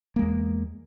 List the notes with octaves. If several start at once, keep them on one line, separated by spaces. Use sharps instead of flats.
E2 G#3 A#3